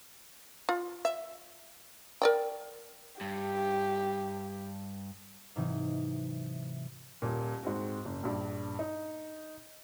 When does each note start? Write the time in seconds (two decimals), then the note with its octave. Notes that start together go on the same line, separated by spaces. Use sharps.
0.69 F4
1.05 E5
2.22 A#4 D5 G5
3.21 G2 G4
5.56 G#2 C3 E3 F#3 D#4
7.22 D#1 A#2
7.63 G#2 C4 F#4
8.05 F#1
8.23 A#1 G2 D5
8.79 D#4